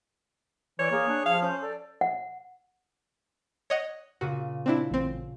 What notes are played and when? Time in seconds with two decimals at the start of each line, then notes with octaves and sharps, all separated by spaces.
0.79 E3 C#5 D5
0.91 A#3 G#4
1.08 D4
1.26 F3 F5
1.42 C#4 C5
1.62 A4 D5
2.01 F#5
3.70 C#5 D#5 F#5 A#6
4.21 A#2 C#3 F#4 D#7
4.66 C4 D4 E4
4.91 A1 C4